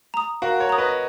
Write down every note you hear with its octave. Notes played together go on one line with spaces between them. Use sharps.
A#5 D#6
F#4 A#4 F5
A#4 C#5
A#5 D#6
B4 D#5